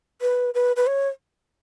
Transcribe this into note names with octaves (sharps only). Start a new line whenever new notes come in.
B4
B4
B4
C#5